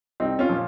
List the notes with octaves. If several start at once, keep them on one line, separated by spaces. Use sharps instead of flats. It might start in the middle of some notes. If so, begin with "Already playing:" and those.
C2 C4 D#4
C#4 F4
A#2 F3